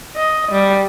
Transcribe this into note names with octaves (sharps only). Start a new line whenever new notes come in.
D#5
G3